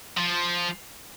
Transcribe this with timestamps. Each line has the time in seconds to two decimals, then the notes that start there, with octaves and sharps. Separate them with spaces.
0.17 F3